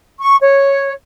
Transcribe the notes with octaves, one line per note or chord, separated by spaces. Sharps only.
C#6
C#5